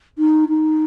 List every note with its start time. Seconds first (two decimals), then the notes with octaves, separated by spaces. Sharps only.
0.18 D#4
0.49 D#4